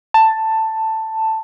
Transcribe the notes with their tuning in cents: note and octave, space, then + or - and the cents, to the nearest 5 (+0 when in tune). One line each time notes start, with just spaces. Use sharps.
A5 +10